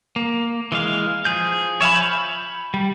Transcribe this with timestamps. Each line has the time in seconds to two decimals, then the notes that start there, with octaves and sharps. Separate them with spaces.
0.16 A#3
0.72 E3 G#3 F5
1.25 F3 G#4 G6
1.81 C#5 E5 F5 G#5 B5
1.95 B5 G6
2.74 G3